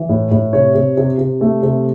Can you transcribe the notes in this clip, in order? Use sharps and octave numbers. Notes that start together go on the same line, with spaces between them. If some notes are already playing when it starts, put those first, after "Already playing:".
Already playing: E3
A2
A2
C3 C#5
C3
C3
C3
A3
C3